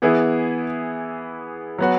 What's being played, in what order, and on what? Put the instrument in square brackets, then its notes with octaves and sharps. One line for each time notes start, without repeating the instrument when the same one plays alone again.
[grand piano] E3 B3 E4 G#4
F#3 B3 F#4